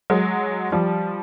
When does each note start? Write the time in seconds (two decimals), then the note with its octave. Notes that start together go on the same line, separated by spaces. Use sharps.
0.10 F#3 G#3
0.72 F3 G3